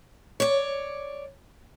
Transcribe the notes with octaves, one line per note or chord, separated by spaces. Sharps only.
C#5 D5